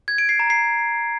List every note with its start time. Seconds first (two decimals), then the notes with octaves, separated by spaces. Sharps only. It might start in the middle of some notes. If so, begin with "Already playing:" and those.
0.08 G#6
0.18 D7
0.29 C7
0.39 A#5
0.50 C7